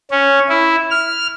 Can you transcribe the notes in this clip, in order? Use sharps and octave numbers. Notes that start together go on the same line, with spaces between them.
C#4
E4
F6